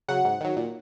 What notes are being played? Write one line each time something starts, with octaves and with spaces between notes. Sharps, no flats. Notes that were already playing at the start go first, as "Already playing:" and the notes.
C#3 F#3 F#5
G#2
D#3 F#3
A#2